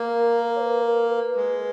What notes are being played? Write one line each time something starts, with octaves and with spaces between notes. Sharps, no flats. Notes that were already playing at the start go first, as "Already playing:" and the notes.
Already playing: A#3 A#4
C#5
B4
A#4
B4
G#3